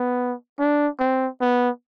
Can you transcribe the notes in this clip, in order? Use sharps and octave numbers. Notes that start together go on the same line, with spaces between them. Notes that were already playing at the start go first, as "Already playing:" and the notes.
Already playing: B3
D4
C4
B3